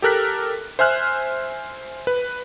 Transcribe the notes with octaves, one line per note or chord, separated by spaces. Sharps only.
G4 A4 A#4 F#6 B6
C5 E5 G#5 F6 F#6
B4